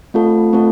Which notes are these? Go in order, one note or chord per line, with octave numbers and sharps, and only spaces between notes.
A3 C4 F4 A4
A3 C4 F4 A4